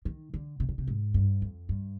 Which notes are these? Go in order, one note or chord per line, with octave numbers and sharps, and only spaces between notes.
D#3
D3
C3
D3
C3
G#2
G2
F2
G2